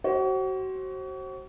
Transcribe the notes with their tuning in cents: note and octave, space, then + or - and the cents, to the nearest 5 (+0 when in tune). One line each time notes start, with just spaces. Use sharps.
F#4 +35 C5 +30